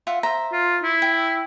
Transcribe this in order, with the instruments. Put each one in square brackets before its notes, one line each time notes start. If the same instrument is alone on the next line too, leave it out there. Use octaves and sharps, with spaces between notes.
[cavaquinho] F4 E5 F#5
C5 E5 A#5
[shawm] F4
E4
[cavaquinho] G5